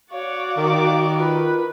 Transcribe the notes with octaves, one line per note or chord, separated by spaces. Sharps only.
F#4 C#5 D5 F5
D#3 D6
F4 B4